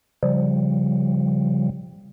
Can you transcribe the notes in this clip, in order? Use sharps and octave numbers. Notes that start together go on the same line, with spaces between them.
C#3 F3 G3